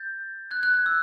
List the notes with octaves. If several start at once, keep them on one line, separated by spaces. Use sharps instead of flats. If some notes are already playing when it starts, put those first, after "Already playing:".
Already playing: G6 A6
F#6 G#6
F#6 G#6
F#6 G#6
E6